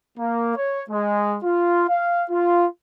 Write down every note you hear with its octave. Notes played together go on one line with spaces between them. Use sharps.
A#3
C#5
G#3
F4
F5
F4